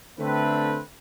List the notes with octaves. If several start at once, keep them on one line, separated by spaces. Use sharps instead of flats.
D3 A3 C4 B4